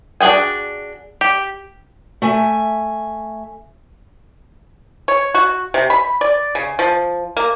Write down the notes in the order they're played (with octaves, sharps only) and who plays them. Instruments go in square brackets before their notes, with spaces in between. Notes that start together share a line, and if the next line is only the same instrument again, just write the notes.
[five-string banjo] D4 F#4 G#4 G5 G#5
G4
[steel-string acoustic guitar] A3 E5 G#5
[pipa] C#5
F#4
C3
B5
D5
C#3
F3
A#3